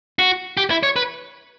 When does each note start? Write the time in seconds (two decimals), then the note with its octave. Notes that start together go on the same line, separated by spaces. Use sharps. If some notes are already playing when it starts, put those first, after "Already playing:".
0.19 F#4
0.57 G4
0.70 E4
0.83 C#5
0.96 B4